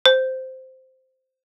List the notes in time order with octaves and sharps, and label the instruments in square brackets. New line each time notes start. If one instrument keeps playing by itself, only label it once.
[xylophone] C5